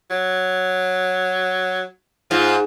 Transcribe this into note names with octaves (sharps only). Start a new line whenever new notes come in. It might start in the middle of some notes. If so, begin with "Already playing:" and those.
F#3
G#2 F4